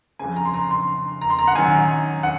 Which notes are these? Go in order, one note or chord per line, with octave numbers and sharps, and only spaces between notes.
F2 C#3 G#5
A#5
C6
A#5
C6
A#5
C6
A#5
F#5
F#2 D#3 G#5
F#5